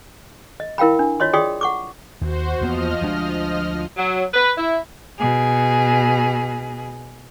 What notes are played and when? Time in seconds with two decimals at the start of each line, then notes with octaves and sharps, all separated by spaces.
0.60 D#5
0.78 E4 A#4 F5 G5 B5
0.99 D4
1.20 F4 C#5 D#5 C6
1.33 F4 G#4 D5 G5 C6 D#6
1.61 F#5 C#6 D6
2.21 D#2 F#4 C5
2.61 E2 F3 A#3 B3 D#5 F6
3.01 D2 G#3 D4
3.97 F#3
4.34 B4
4.57 E4
5.18 B2 G#4